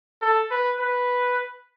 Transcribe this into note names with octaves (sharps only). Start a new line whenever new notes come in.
A4
B4
B4